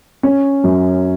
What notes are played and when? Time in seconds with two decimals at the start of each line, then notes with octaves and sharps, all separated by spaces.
0.23 C#4
0.64 F#2